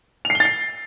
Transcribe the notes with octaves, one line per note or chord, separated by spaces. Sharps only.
F7
C7
G7
A6
C7